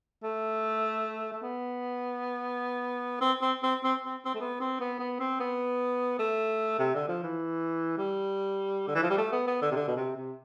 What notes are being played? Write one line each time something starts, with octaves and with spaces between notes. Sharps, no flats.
A3
A3
B3
C4
C4
C4
C4
C4
C4
A3
B3
C4
B3
B3
C4
B3
A3
C3
D3
F3
E3
G3
D3
E3
F3
G3
A3
B3
B3
D3
C3
D3
B2
C3
C3